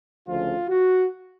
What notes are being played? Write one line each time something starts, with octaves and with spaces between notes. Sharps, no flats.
D2 C#3 F3 F4
F#4